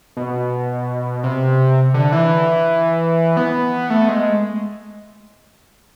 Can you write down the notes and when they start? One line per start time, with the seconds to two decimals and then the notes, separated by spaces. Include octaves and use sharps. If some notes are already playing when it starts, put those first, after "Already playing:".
0.17 B2
1.23 C3
1.94 D3
2.12 E3
3.37 B3
3.90 A3
4.08 G#3